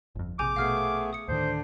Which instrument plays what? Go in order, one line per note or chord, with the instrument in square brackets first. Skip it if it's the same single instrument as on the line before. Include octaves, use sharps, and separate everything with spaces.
[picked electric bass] G1 F2
[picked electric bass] A#1 C3 [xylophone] G#4 G#5 G6 [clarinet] D6
[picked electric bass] A#1 B2 [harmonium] A3 B3 G#4 [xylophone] F5 F6 C7
[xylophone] D#6 C#7
[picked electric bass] D2 A2 D#3 [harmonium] D3 D4 [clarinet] C5